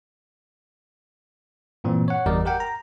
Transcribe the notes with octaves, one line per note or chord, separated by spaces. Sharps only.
G2 A#2 E3 C4
C#5 F#5
G1 E2 G3 A#4 D5 D#5
G4 A#4 F#5 G5
A#5